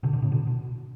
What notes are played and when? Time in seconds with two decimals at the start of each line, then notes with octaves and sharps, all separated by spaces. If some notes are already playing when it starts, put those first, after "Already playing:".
0.03 B2 D3
0.13 B2 D3
0.22 A2 C#3
0.32 B2 D3
0.47 B2